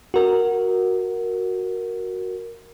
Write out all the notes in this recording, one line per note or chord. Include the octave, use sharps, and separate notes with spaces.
F#4 A#4